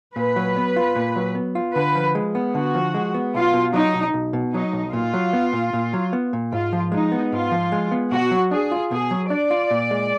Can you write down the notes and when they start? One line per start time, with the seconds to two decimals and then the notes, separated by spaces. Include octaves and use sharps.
0.16 A#2 B4
0.36 F#3
0.57 B3
0.76 F4
0.96 A#2
1.16 F#3
1.35 B3
1.55 F4
1.75 D3 B4
1.95 F3
2.15 G#3
2.35 B3
2.55 D3 F#4
2.75 F3
2.94 G#3
3.14 B3
3.34 B1 F4
3.54 B2
3.74 F#3 D#4
3.94 B1
4.14 B1
4.33 B2
4.54 F#3 D#4
4.73 B1
4.93 A#2 F4
5.14 F#3
5.33 B3
5.53 A#2
5.73 A#2
5.93 F#3
6.13 B3
6.33 A#2
6.52 G#2 F4
6.73 F3
6.92 G#3 D#4
7.12 B3
7.32 G#2 F4
7.51 F3
7.72 G#3
7.91 B3
8.11 B2 F#4
8.31 F#3
8.51 D4 G#4
8.71 F4
8.91 B2 G#4
9.11 F#3
9.30 D4 D5
9.51 F4
9.71 A#2
9.91 G#3